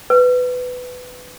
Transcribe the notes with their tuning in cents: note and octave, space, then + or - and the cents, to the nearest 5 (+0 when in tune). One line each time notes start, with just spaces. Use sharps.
B4 +15